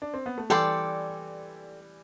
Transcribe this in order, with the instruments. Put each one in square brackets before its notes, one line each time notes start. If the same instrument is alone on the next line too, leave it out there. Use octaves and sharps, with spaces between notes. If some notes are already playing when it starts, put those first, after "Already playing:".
[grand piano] D4
C4
B3
A3
[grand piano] E3 G3 [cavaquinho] A4 D5 G5 C6